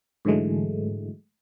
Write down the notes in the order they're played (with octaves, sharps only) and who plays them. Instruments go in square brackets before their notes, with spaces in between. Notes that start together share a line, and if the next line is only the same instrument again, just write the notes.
[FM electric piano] G#2 D3 E3 F#3 G#3 A3